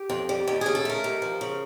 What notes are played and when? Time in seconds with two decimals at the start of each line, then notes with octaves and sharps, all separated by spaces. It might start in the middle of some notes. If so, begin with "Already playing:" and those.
Already playing: G4
0.10 F2
0.29 G3
0.47 D#2
0.61 C#3 G#4
0.75 A4
0.85 A3 A#4
1.04 D#2
1.22 F3
1.41 C#3